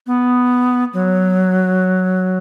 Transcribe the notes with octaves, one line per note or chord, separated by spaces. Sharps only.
B3
F#3